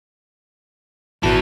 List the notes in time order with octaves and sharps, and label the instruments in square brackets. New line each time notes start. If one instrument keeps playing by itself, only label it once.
[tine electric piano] G#1 A#2 A5 [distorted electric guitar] E3 B3 [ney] F#4